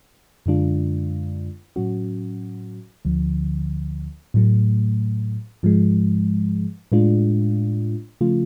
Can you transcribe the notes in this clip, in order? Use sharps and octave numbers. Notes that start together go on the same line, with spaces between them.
F#2 D3 G#3 D4 F4
A2 F#3 C#4 F#4
D2 D3 F3
A2 F#3 A3
G#2 F3 G#3
A2 G#3 D4 F4
C#3 F3 A3 F4